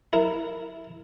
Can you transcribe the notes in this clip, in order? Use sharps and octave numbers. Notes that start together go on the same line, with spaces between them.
E4 A#4